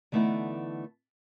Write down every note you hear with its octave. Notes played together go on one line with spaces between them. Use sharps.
D3 E3 A3 B3 D#4 E4